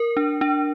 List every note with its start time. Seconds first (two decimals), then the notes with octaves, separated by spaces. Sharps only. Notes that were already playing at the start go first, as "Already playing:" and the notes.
Already playing: A#4
0.17 D4
0.41 D4